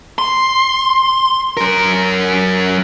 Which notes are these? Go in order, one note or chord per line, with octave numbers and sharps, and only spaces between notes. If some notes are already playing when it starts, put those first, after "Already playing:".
C6
F#2 A#4